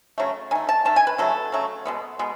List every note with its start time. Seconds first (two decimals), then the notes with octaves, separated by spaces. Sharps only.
0.18 C#3 F#3 A3
0.51 D#3 A3 G#5
0.69 A5
0.85 D#3 A3 A5
0.96 G#5
1.07 B4
1.18 C#3 F#3 A3 A4
1.52 C#3 F#3 A3
1.85 B2 G#3 B3
2.19 B2 G#3 B3